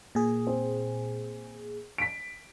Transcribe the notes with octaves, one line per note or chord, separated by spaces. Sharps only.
A#2 G#4
C4
B6 D7